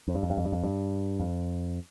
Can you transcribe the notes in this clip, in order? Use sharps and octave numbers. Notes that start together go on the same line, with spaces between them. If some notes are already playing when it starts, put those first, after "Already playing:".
F2
G2
F2
G2
F2
G2
F2
G2
F2